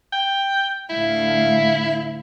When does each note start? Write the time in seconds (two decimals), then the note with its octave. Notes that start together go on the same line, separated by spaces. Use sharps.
0.13 G5
0.89 D2 A2 E4 F5